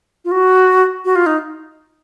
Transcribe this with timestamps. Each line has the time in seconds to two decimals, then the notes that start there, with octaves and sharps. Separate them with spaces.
0.25 F4
0.31 F#4
1.05 F#4
1.16 F4
1.26 D#4